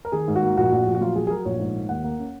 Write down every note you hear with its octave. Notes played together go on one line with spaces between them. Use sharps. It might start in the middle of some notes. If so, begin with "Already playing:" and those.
A#4
D#3 G#4
G#2
F#4
A#3
A#1 F#4
A#1
A#1
F#4
F#3 F4
F#3 G#4
G#4
F#3 A#4
A#1 C#5
G#2
A#3
D#2 F#5
A#3
C#4